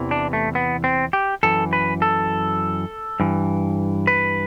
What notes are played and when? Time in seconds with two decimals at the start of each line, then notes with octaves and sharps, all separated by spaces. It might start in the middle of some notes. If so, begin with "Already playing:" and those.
Already playing: E2 C3 E3
0.11 D4
0.33 A3
0.55 B3
0.84 C4
1.13 G4
1.43 F#2 E3 A4
1.73 B4
2.02 A4
3.20 G2 E3
4.07 B4